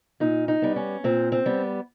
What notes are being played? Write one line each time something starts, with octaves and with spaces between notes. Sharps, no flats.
A#2 D#4
D#4
G3 B3
C#4
A#2 C4
C4
G3 B3